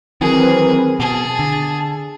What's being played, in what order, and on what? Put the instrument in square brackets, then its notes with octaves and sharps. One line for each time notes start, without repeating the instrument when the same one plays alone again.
[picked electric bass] D#3 E3 F#3 [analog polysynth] C4 A#4 B4 [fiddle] G#4
[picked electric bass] B2 [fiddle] G#4 [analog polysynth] A5
[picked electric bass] D3